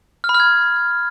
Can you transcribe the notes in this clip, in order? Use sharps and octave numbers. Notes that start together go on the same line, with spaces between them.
F6
B5
F6
G#6